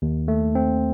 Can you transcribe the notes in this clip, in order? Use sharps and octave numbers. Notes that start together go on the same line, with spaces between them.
D#2
A3
C4